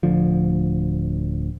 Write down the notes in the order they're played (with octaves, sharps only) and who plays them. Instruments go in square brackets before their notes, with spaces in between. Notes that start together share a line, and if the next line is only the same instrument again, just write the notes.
[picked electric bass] D1 D2 D3 F3